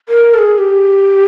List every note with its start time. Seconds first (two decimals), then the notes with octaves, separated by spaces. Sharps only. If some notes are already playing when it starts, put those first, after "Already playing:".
0.09 A#4
0.34 A4
0.38 G#4
0.58 G4